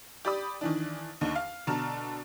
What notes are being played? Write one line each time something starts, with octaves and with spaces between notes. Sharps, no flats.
G4 D5 B5 D#6
D#3 E3 D4
D#2 D3 D#4
F5
B2 D3 A5 A#5 F6